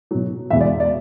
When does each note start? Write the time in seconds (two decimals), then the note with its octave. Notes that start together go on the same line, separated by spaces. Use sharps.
0.11 B2 F#3
0.50 E2 B2 G#3 E5
0.61 D5
0.80 D5